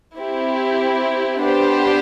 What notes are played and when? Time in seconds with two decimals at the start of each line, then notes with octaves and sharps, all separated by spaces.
0.17 C4 E4 G4
1.40 B3 D4 G4 C5